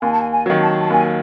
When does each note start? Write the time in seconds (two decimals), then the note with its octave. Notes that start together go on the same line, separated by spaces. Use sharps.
0.02 D#2 G#5
0.12 A5
0.21 G#5
0.32 G#5
0.46 D#3 F#3
0.61 A5
0.81 A5
0.90 D#2 G#5